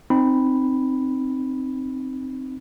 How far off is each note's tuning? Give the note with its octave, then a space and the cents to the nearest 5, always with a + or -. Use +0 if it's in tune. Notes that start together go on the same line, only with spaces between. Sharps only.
C4 +0 D#4 -15 B5 +0